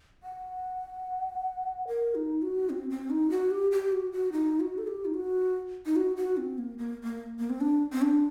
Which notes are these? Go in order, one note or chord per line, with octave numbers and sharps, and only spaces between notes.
F#5
A#4
D#4
F#4
C4
C4
D#4
F#4
G4
G4
F#4
F#4
D#4
F#4
A4
G4
D#4
F#4
D#4
F#4
F#4
C4
A#3
A#3
A#3
A#3
C4
D4
C4
D4